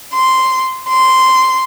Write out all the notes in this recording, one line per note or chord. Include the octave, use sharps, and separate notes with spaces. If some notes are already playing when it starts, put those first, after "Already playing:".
C6
C6